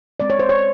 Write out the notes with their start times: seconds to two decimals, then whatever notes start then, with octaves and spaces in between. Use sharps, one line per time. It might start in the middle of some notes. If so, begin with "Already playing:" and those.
0.20 G#3 C4 D5
0.30 C#5
0.39 C5
0.49 C#5